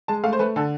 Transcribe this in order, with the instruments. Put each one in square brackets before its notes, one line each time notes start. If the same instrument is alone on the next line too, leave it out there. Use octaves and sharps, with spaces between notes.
[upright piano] G#3 A5
A3 F5
C5
A3 B4
D3 A4